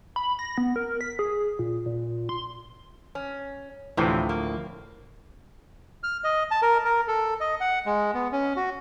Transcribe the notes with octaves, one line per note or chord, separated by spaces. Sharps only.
B5
A#6
B3
A#4
B6
G#4
A#2
A#2
C6
C#4
D2 A2 C3 E3 F3
A#3
F6
D#5
A5
A#4
A#4
A4
D#5
F#5
G#3
B3
C#4
F#4